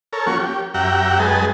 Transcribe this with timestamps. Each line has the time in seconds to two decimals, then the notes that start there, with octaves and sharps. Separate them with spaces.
0.13 A4 A#4 C#5
0.26 F3 A#3 C#4 F#4 C#6
0.39 G4
0.74 F#2 G4 E5 F#5 G5 A#5
1.19 F#2 G#3 G#4 B4 D#5 A5